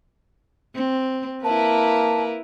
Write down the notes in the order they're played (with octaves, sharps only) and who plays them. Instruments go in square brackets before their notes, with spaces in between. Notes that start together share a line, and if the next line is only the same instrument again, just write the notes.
[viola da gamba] C4
[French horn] A#3 [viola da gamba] E4 A#4 B4 [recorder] A5